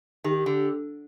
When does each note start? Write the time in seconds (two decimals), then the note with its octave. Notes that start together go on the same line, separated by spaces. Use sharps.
0.24 D#3 G4
0.46 D3